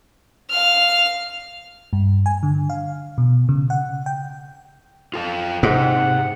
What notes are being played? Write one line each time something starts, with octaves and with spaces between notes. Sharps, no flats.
F5 F6
G2
G#5
D3
F5
B2
C#3
F#5
G5
F4 A4 F5
G#2 C3 F#5